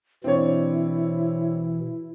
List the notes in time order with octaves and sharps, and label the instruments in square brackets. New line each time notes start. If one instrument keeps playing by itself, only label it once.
[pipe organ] B2 E3 [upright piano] C4 D4 C#5 [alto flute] E4